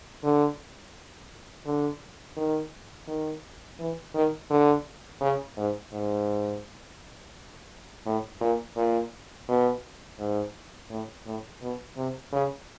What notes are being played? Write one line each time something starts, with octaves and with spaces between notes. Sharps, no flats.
D3
D3
D#3
D#3
E3
D#3
D3
C#3
G#2
G#2
A2
A#2
A#2
B2
G#2
A2
A2
B2
C3
C#3